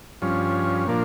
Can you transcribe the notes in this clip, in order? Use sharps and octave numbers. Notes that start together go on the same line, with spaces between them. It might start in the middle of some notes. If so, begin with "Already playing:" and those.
G2 F3 C#4
A#2 F3 A#3 D4